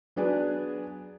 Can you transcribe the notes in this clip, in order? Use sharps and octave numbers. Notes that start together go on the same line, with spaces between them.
F#3 B3 D4 G#4 B4 D5